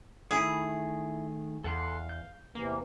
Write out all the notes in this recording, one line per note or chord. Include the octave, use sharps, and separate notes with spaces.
D#3 A3 E4 G#4
E2 A4 F5 F#5 C6
G6
E2 C3 E3 A#3